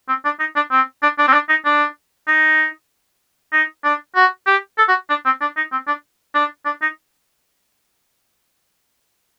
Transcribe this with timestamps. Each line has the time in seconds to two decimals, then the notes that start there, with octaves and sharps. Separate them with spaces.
0.08 C4
0.25 D4
0.40 D#4
0.56 D4
0.71 C4
1.03 D4
1.19 D4
1.28 C4
1.33 D4
1.49 D#4
1.65 D4
2.28 D#4
3.53 D#4
3.84 D4
4.15 F#4
4.46 G4
4.78 A4
4.88 F#4
5.10 D4
5.25 C4
5.41 D4
5.57 D#4
5.72 C4
5.87 D4
6.35 D4
6.65 D4
6.82 D#4